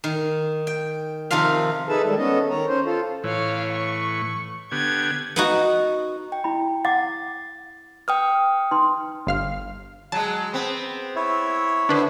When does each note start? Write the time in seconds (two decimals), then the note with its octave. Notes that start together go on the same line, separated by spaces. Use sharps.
0.04 D#3
0.67 G5
1.31 C3 D#3 F3 F4 F5
1.89 D#4 G#4 A4 B4 E5 A5
2.04 D#3 G3 G#3 A4
2.18 B3 C#4 A4 D#5
2.50 D#3 C#5 A#5
2.68 C#4 C5
2.86 F4 A4
3.24 A2 E3 C#5 F5
3.73 C#6
4.72 D3 B3 G4 G#6
5.36 B3 D#4 F#4
6.32 G5
6.44 E4 B5
6.85 F#5 D6 A6
8.08 B4 G5 D#6 F6
8.71 D#4 B4 C6
9.27 G1 F5 F6
10.12 F#3 G#3 A5
10.53 B3 C4
11.16 E4 C#5 E5
11.89 D3 D4 B4 C5